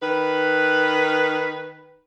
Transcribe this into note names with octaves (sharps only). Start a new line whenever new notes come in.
D#3 B4